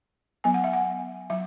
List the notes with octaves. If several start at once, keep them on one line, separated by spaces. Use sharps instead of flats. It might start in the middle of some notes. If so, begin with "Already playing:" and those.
F#3 B3 G#5
F#5
E5
F#5
F#3 E5